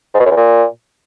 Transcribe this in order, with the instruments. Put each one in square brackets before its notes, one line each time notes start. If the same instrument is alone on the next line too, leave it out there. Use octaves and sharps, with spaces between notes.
[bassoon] G#2
B2
F#2
E2
A#2